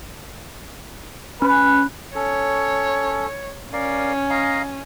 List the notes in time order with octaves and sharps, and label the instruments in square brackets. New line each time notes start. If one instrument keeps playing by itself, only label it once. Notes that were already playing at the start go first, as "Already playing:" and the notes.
[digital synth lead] C#4 [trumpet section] B4
[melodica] C#4 A4 [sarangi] C#5
[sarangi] C#4 [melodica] A#4 D5 F5
[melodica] D#5 F5 A#5